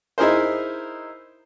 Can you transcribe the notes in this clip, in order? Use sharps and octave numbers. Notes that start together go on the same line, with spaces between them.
D#4 E4 G#4 A#4 C5